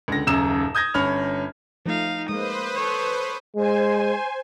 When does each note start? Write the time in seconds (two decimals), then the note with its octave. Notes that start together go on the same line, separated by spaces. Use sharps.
0.08 C#2 D3 A#6
0.27 D#1 F#2 C#3 A#5 E6 E7
0.75 D#6 G6 G#6 A#6
0.94 G1 C#4 B5 F6 F7
1.86 F3 A3 D#4 F5
2.29 G#3 A#3 B4 C5 D#6
2.75 A4 C#5
3.56 G#3 C5 G#5